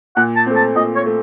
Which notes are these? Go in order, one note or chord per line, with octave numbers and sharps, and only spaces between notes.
A#2 F#5
A5
A3 C4
A5
A#2 D#5
C#5
A3